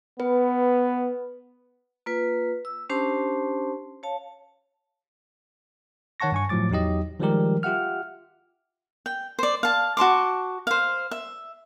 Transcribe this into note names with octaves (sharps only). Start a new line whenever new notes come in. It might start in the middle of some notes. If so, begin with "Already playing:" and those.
B3 B4
A#3 F4 B4
E6
C#4 D4 G4 C5 A5 C6
C#5 F5 A5
D#3 C#5 F#5 A5 C#6 A#6
G2 G#5 C#6
A2 F3 F#3 D6 A6
E2 F#3 D#4 G4 D#5
D#3 F3 G3 G#3 G4 A#4
F4 G4 E5 F#5 F6
G5
C5 D5
F5 A5
F#4 A5 C6 D6
C5 F5
E5